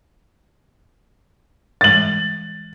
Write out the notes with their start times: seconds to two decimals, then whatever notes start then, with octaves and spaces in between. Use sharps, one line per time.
1.81 E3 G3 G#3 A6 F#7